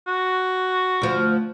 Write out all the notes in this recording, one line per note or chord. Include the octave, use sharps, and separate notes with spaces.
F#4
D2 F3